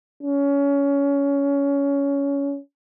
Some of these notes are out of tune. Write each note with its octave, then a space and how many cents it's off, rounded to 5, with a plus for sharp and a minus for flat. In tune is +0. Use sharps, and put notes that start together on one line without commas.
C#4 +20